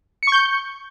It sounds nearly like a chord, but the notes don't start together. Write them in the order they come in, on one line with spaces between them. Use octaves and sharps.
C#7 C#6 G6